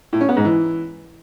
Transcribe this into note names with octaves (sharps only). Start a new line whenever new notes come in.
A2
C#4
B3
G#2
E3